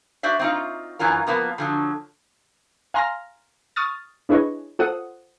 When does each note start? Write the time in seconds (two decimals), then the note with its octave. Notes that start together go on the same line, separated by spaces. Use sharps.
0.23 F#4 C5 D5 E5
0.39 C4 D#4 F4
0.99 F#2 E3 C#4 F4 A#4
1.27 F3 A#3 B3 F4
1.58 D3 F3 F#3
2.94 F5 G#5 A#5 C6 F6 A#6
3.76 C#6 D#6 F6 A6
4.29 D4 E4 G#4 B4 C#5 D#5
4.79 F4 A4 C5 F#5 D#6